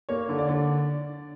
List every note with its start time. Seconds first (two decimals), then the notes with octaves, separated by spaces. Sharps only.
0.09 A#3 C#5
0.29 D3
0.38 D5
0.49 D3